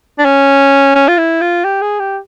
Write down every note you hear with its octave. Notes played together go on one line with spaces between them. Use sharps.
D4
C#4
C#4
F4
E4
F4
G4
G#4
G4